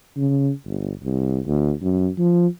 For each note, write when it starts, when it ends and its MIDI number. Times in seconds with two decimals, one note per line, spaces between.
0.17 0.51 49
0.65 0.91 31
1.03 1.39 36
1.47 1.72 38
1.82 2.08 42
2.18 2.46 53